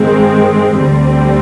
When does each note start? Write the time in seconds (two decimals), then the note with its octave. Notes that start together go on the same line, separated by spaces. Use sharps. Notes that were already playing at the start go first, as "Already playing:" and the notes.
Already playing: G2 D#3 G#3 C4
0.76 D2 D3 G3 C4